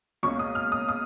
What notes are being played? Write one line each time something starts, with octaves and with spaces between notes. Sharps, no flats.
C#2 B2 A#3 C#4 C#6
D#6
F6
D#6
D#6